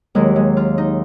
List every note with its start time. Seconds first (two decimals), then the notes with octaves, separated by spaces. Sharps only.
0.15 D#2 D#3 F#3 G#3
0.36 G#3
0.57 F4
0.78 D#4